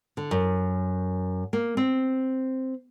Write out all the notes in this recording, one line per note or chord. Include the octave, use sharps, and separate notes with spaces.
D3
F#2
A#3
C4